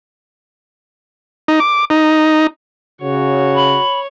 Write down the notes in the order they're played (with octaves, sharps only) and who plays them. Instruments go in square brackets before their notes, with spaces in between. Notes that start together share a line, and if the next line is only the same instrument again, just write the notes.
[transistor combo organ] D#4
D6
D#4
[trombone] C#3 [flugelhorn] F#4 [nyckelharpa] C#5
[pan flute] B5